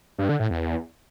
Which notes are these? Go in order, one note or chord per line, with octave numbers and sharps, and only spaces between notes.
G2
D3
A2
E2